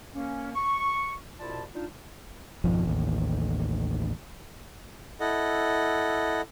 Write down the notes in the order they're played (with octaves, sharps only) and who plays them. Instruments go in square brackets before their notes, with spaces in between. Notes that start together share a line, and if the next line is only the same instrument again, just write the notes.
[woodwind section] A#3 C#4
C#6
C2 B2 E4 F4 D5 A5
D4 D#4 F4
[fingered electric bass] G#1 F2 B2 F3
A1 D#2
[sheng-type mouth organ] E4 A4 D#5 F#5